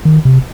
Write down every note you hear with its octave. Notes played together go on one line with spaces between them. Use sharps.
D#3
C3